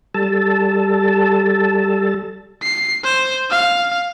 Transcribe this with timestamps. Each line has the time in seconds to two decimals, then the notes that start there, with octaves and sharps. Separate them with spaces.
0.14 G3 A4 A5
2.63 C7
3.04 C5
3.51 F5